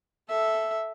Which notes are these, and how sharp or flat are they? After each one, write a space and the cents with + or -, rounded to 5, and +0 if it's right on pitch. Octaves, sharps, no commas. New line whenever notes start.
A4 -10 E5 +0